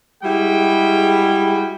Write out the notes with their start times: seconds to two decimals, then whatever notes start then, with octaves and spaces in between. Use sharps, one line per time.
0.23 G3 G#3 E4 F#4 G#4 G5